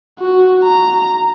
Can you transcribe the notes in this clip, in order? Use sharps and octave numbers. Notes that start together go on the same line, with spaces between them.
F#4
A#5